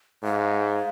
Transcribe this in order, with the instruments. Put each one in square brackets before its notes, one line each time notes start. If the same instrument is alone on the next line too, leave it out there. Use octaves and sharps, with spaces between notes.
[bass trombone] G#2 [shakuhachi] F5